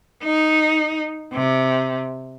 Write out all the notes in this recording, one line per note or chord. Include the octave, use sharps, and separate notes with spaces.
D#4
C3